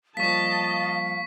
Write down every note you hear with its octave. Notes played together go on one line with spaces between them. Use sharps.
F3 G3 A#3 D#5 F5 A5 C#6 B6